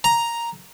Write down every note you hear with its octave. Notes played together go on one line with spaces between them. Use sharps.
A#5